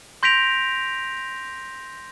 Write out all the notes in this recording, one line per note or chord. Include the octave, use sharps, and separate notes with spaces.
C6 G6 A#6 B6 D7 F7